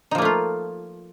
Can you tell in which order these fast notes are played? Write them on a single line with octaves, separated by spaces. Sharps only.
D#4 F3 A#3 A3 F4